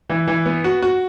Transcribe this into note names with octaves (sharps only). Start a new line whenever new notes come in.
E3
E3
B3
F#4
F#4